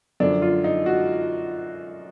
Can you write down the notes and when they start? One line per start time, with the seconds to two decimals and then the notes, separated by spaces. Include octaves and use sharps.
0.20 F#2 D3 F3 D4
0.42 F4
0.64 D#4
0.86 F#4